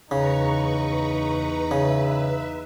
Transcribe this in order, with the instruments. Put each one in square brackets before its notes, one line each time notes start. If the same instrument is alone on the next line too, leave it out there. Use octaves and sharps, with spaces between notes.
[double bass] E2 D#4 [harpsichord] C#3 [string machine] B4 A#5 C#6
[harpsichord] C#3 [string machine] B4 E5